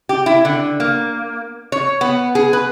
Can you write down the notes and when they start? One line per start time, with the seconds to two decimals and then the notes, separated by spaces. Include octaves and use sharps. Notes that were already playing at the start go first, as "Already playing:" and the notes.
0.09 G4
0.26 E4
0.45 D3
0.80 A#3
1.72 C#5
2.01 B3
2.35 G#4
2.53 B4